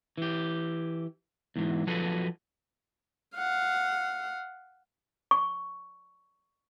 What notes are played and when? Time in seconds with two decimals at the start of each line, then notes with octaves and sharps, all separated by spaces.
0.17 E3 G4
1.56 E2 G#2 E3
1.87 F3 F#3 F#4 G#4 A4 B4
3.36 F5 F#5
5.31 C#6